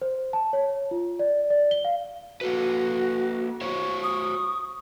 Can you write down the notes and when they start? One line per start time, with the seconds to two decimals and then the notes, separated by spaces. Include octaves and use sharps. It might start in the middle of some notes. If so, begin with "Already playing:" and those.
0.02 C5
0.33 A5
0.53 C#5
0.91 F4
1.19 D5
1.50 D5
1.71 G7
1.85 F5
2.41 A#3 F#4 A4 B4
3.61 F#4 C5 C#5 C#6
4.04 D#6